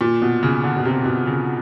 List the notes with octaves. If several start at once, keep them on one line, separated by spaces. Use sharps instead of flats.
A#2
B2
C#3
D3
B2
C3
B2
C#3